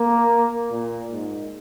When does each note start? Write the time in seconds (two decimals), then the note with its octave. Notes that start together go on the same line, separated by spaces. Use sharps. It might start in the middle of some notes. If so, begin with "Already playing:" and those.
Already playing: A#3
0.71 A#2
1.11 G#2